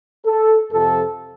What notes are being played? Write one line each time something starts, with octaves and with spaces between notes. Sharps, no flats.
A4
F2 C3 F3 A4